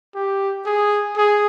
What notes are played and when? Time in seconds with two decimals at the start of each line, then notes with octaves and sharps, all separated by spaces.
0.15 G4
0.66 G#4
1.17 G#4